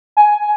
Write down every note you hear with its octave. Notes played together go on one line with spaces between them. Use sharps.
G#5